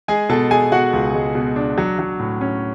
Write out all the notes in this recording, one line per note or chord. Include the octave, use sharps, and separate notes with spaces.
G#3 G#4 G#5
B2 A4 A5
G#3 G#4 G#5
B2 F#4 F#5
C#2
G#3
B2
D4
F#3
F#3
A2
C#4